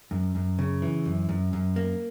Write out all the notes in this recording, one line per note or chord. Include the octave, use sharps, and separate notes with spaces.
F#2
F#2
C#3
E3
F#2
F#2
F#2
A#3